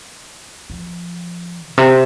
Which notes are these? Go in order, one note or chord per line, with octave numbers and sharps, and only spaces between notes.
F3
A#2
C3